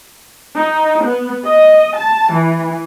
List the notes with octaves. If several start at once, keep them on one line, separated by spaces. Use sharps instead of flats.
D#4
B3
D#5
A5
E3